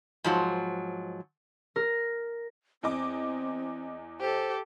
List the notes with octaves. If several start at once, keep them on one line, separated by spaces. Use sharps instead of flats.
G#2 F3 F#3
A#4
E2 C4 D#5 D6
G4 A4 C5